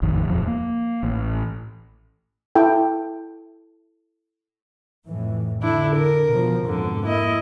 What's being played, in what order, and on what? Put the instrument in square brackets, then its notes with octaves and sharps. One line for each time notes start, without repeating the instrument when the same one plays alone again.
[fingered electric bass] A1 F2 D#3
D#1 F2 F3
A#3
A1
[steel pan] E4 A4 G5
[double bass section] F2 A2 E3
[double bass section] D3 [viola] D4 E4
[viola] A#4
[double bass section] B2 F3
[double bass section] F2 G#2 B2 [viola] D3
[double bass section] A#3 [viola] E4 D#5